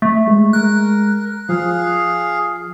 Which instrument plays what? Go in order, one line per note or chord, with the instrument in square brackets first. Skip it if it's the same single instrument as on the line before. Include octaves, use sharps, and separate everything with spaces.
[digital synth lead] A3
[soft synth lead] G#3
[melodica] A#4 [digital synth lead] F#6
[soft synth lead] F3 [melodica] G#4 F5